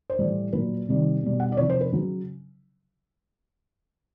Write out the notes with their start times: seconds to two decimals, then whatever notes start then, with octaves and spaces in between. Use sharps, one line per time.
0.10 C5
0.19 A2 E3 G3
0.53 A#2 F#3 B4
0.88 C3 D#3 G3
1.23 B2 G3
1.40 F#5
1.52 D5
1.57 C3 F3 C#5
1.70 C5
1.81 B4
1.92 C#3 F#3